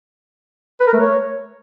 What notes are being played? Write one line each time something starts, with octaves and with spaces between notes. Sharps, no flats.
B4
A#4
A3
C#5